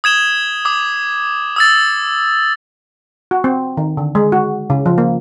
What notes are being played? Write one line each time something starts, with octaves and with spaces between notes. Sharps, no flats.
D#6 G#6 E7 G7
D6 D#6
D#6 E6 A6
F#4
C4
D#3
D3
G#3
F#4
C#3
F3
A#3